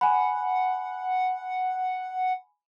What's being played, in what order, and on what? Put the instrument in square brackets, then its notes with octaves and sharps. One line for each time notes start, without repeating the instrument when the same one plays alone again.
[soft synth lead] F#5 [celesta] G#5 B5